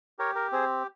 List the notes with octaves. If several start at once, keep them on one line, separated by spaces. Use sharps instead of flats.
G4 A#4 C#5
A#4
C4 G#4 C5